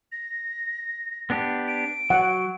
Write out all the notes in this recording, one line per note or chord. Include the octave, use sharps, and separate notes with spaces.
A#6
B3 D4 G4
D7
F#3 F#5